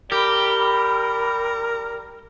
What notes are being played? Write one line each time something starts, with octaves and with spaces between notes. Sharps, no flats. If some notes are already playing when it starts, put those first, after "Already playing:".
G3 G4 A#4 B5